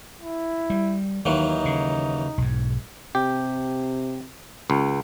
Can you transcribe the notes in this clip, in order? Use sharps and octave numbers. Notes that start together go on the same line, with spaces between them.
E4
G3
D#2 D#3 E3 F#3 D#4
C#3
B1 G#2
C3 G4
C#2